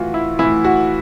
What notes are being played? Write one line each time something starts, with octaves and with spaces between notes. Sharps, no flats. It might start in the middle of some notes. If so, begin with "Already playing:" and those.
Already playing: A2 E3 F4 F#4
E4
A2 E3 E4
F#4